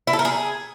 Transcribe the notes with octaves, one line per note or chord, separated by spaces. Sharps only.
E4
A4
A#4
G#4